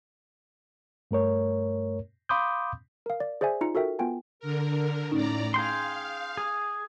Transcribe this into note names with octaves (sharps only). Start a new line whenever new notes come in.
G2 A3 A#4 C#5
F5 B5 C6 D6 D#6 G6
A#4 F5
D5
G#4 C5 D5 E5 G#5
D#4 F4 A#5 C#7
F#4 A4 A#4 E5 G5
B3 F4 G5 G#5
D3 A#4
A2 C#4 D#4 D5 A#5
G#4 F5 G5 C6
G#4